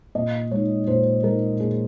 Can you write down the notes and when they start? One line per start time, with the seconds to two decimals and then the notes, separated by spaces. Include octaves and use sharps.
0.15 A#2 D#5
0.51 G#3 D#4 C#5
0.87 A#2 C5
1.24 G#3 D#4 A#4
1.60 A#2 G#4